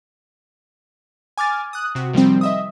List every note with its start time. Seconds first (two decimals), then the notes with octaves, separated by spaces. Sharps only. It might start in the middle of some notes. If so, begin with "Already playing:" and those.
1.37 G#5 D6 F6 A6
1.73 D#6 F#6
1.95 C3 F#4
2.13 D#3 F3 G3 C4
2.41 D#5 E5 D#6